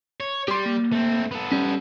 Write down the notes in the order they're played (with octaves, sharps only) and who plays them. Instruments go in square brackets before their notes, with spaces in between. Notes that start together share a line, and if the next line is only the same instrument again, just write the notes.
[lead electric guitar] C#5
[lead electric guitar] G3 [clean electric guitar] G4 C6
[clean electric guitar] A#3
[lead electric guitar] A3 C4
B3 A4
[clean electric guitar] G3 C#4